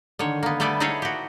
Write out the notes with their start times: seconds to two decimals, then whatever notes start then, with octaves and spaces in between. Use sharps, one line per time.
0.19 D3 D#3 C#5
0.43 A#3 B3
0.60 G3 A3 B3 A4 D5 G#5
0.80 D#4 E4 G#4 A4 C#5 F5
1.02 F#4 G4